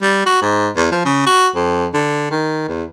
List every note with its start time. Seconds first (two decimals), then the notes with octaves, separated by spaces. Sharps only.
0.02 G3
0.26 F#4
0.42 G#2
0.76 E2
0.91 F3
1.05 C#3
1.26 F#4
1.55 F2
1.93 D3
2.31 D#3
2.68 E2